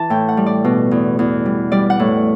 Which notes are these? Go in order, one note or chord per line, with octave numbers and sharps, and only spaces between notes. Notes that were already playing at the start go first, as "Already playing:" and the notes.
Already playing: E3 A5
A2 G5
F#5
G3
D5
B2
E2
E2
G3
G3 D5
F#5
A2